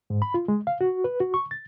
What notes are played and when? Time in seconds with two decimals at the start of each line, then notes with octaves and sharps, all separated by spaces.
0.10 G#2
0.22 B5
0.34 F4
0.48 G#3
0.67 F5
0.81 F#4
1.04 B4
1.20 F#4
1.34 C#6
1.51 A6